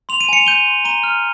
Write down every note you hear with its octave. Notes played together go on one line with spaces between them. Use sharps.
C6 F7
D#7
G#5 C#7 F7
F7
G6 D#7 G7
C6
A#5 D#7 G7
F6